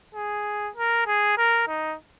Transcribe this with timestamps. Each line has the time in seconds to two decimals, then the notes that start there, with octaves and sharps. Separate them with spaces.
0.15 G#4
0.76 A#4
1.07 G#4
1.38 A#4
1.68 D#4